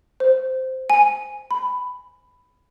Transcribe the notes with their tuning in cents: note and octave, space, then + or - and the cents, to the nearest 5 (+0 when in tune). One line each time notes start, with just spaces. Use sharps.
C5 -5
G#5 +0
B5 +10